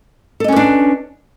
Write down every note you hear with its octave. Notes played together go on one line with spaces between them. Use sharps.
C#4 D4 A4 B4 D#5